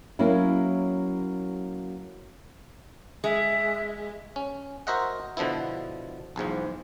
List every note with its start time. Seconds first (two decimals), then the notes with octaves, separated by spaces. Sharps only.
0.19 F#3 A#3 B3 C#4 E4
3.24 G#3 E5
4.36 C#4
4.87 F#4 A#4 C5 D#5 E5 F#5
5.37 B2 D3 F3 B3 E4
6.36 B1 E2 G#2 F3